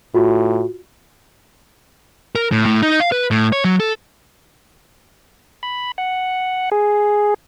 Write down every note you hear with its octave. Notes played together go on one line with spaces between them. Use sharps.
A2 F4 F#4
A#4
A2
A2
D#4
F5
B4
A2
C#5
F#3
A4
B5
F#5
G#4